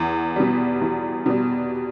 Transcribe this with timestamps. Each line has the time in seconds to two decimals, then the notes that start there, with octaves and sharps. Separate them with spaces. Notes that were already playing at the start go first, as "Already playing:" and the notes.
Already playing: E2
0.36 B2 G3
0.81 E2
1.26 B2 G3